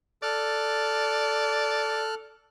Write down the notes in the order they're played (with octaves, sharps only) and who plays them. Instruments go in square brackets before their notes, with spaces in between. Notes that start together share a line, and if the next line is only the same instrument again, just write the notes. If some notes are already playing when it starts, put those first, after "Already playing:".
[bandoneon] A4 F6 F#6 [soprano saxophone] D5